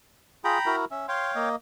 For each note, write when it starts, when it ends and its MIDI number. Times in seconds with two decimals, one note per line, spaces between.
0.44 0.58 65
0.44 0.58 68
0.44 0.76 79
0.44 0.76 82
0.44 0.76 83
0.66 0.85 64
0.66 0.85 66
0.66 0.85 70
0.91 1.06 61
0.91 1.07 76
1.08 1.49 73
1.08 1.49 77
1.08 1.49 79
1.08 1.31 84
1.35 1.56 58
1.35 1.56 75